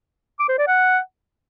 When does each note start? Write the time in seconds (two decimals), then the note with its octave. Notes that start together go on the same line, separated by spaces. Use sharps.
0.39 D6
0.49 C5
0.58 D5
0.67 F#5